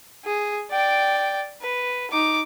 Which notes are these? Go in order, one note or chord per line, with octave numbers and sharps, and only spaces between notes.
G#4
D5 G5
B4
D#4 D6